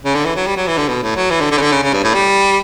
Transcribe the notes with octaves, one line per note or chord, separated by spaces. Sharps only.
C#3
D3
E3
F#3
G3
F#3
E3
D3
B2
A2
F#3
E3
D3
D3
C#3
D3
C#3
C#3
G2
A2
G3